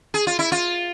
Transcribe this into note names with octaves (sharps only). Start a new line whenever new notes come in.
G#4
F4
E4
F4